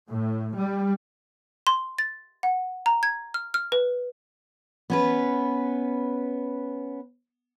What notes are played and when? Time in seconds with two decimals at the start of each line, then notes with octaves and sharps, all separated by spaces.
0.11 A2
0.56 G3
1.67 C6
1.98 A6
2.43 F#5
2.86 A#5
3.03 G#6
3.34 F6
3.54 F6
3.72 B4
4.90 B3 C#4 B4